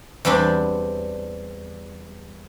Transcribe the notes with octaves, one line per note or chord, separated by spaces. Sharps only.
E2 G3 C4 D4